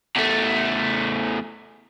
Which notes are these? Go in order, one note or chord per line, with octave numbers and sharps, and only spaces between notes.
E2 A3